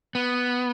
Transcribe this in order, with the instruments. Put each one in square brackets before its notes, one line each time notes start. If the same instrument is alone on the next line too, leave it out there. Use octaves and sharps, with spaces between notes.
[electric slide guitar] B3